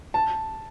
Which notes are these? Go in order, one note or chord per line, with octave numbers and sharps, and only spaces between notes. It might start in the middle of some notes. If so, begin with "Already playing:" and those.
A5